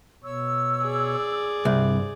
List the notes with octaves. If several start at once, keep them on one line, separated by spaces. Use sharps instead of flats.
B2 C#5 E6
G#4 D5
C2 G2